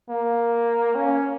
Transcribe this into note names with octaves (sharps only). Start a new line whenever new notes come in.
A#3
C#4